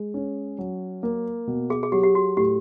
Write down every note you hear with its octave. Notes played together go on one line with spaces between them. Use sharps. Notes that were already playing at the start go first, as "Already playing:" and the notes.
Already playing: G#3
C#4
F#3
A#3
B2
G#4
G#4
F#3 G4
G4
F#4
A2 G4